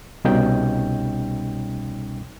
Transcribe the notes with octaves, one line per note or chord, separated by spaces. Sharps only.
C2 B2 G3 C#4 D#4 G5